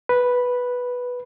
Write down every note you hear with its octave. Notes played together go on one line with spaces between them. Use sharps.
B4